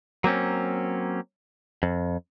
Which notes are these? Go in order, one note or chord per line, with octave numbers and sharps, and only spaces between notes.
F#3 A#3 C4 C#4
F2